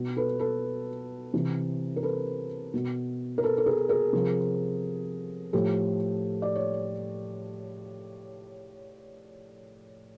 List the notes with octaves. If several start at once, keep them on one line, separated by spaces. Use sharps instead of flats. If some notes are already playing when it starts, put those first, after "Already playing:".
Already playing: B2
A4 B4
A4 B4
C3 E3
A#4
A4 B4
B2
A#4
A4 B4
A4
G#4 A#4
G#4 A#4
C3 F3
A2 F3 G4 A4
D5
C#5